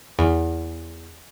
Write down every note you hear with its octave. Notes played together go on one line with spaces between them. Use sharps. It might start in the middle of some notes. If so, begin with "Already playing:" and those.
E2